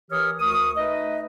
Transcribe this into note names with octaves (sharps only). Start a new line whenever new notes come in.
E3 G4 A#4 C#5 D#6 F6
D2 A#4 C#6 D#6
A3 D#4 B4 D#5